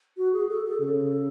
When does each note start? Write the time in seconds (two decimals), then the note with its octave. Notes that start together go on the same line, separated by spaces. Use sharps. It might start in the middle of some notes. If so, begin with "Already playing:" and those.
0.17 F#4
0.33 G#4
0.49 A4
0.65 A4
0.80 C#3 A4